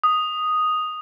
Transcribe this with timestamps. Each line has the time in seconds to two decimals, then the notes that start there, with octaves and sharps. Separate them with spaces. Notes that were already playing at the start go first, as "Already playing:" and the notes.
0.04 D#6